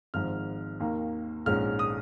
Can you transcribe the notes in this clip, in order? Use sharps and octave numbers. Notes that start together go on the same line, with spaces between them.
G#1 G#2 F3 F6
D#2 D#3 A#3
A#1 G#2 G#3 C#4 F6
D#6